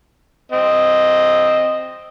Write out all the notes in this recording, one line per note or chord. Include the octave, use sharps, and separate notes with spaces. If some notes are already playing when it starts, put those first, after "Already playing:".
C4 D#5